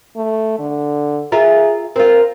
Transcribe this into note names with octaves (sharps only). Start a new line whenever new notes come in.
A3
D3
F4 G#4 A#4 E5
C4 F4 A#4